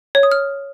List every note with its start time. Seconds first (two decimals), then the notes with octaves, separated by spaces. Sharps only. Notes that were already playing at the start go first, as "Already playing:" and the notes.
0.15 C#5
0.23 D#6
0.32 F6